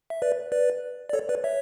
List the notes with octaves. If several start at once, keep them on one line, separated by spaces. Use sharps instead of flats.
E5
B4 D5
B4 D5
D5
A4 C#5
B4 D5
C#5 E5